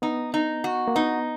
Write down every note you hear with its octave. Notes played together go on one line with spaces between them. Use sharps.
B3 D#4
D#4
F#4
A#3
B3 D#4